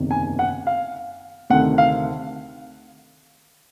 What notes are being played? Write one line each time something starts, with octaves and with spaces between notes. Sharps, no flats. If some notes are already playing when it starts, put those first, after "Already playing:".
Already playing: F#1 E2 C3 D#3
G#5
F#5
F5
D2 C3 D#3 F#5
F5